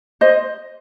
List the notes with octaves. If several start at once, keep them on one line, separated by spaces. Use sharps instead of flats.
C5 D#5